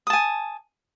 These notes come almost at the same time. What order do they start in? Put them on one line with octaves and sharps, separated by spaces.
D#6 A5 G#5